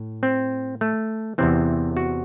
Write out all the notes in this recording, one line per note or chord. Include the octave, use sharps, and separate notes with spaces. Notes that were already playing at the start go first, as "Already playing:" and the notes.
Already playing: A2
C4
A3
E2 C3 E3 C4
F#4